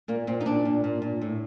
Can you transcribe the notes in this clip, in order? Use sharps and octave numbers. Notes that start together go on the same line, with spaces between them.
A#2 A#3
A#2 C4
D#4
A#2 D4
A#2
A#2
A#2
A2